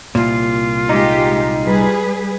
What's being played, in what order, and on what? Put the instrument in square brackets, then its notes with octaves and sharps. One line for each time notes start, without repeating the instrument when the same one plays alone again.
[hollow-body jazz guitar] C2 A#2 [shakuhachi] F4
[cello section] G#3 G4 [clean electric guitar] D#4
[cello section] G3 G#4 B4